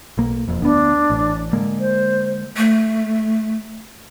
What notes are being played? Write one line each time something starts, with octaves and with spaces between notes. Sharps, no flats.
B1 A#3
E1 F2
D2 B3 D4
A1
D3 G#3 A#3
C5
A3